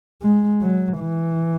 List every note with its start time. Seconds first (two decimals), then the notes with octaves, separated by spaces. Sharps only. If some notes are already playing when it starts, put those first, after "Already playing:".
0.22 G#3
0.62 F#3
1.00 E3